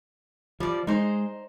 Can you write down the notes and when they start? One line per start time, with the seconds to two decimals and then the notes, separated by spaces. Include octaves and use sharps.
0.60 F3 G3 D5
0.87 G#3 D#4 C5